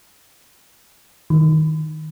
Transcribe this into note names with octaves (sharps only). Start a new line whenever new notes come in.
D#3